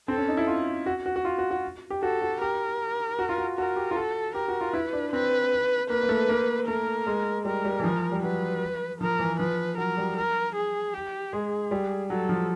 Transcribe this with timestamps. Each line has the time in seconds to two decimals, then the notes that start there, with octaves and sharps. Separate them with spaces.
0.08 C4 A4
0.18 C#4
0.29 D#4
0.37 E4
0.47 F4
0.86 F#4
1.06 F#4
1.16 F#4
1.25 F4
1.38 F#4
1.51 F#4
1.90 G4
2.02 F#4 A4
2.22 F#4
2.41 G4 A#4
3.19 F#4
3.29 F4
3.38 F#4
3.58 F#4 A#4
3.76 G4
3.91 F4
3.96 F#4 A4
4.35 G4 A#4
4.48 F#4
4.61 F4
4.73 E4 B4
4.93 D4
5.13 C4 B4
5.90 A#3 B4
6.03 A#3
6.09 A3
6.29 A#3
6.68 A3 A#4
7.07 G#3
7.45 G3 A#4
7.65 G3
7.80 E3
7.84 F3
8.12 G3
8.22 F#3 B4
9.00 F3 A#4
9.19 E3
9.39 F3 B4
9.77 F#3 A#4
9.97 G3
10.16 A#4
10.55 G#4
10.94 G4
11.32 G#3 G#4
11.71 G3
12.10 F#3 A4
12.29 F3